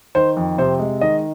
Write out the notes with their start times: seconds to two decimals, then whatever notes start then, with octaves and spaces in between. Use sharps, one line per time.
0.15 D#3 C5
0.37 F2
0.58 C3 C5
0.79 G#3
1.01 D#3 D#5